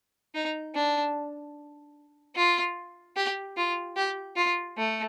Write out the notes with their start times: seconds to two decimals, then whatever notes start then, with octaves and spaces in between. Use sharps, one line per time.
0.35 D#4
0.75 D4
2.36 F4
3.16 G4
3.57 F4
3.96 G4
4.36 F4
4.77 A3